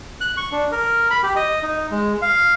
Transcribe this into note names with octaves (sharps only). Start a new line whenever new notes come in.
F#6
C#6
D4
A#4
B5
G4
D#5
D#4
G#3
F5